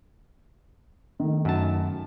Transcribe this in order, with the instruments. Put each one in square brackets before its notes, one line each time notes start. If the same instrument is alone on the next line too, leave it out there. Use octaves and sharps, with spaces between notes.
[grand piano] D#3 A3
[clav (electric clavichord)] F#2 A5